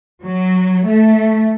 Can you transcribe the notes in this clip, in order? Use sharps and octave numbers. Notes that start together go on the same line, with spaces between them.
F#3
A3